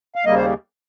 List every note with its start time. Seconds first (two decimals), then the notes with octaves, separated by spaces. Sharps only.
0.16 F5
0.25 D#2 C#3 G3 A#3 D#5
0.36 C5